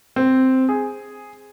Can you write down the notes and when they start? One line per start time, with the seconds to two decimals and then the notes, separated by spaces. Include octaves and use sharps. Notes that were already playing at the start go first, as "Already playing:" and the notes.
0.16 C4
0.69 G#4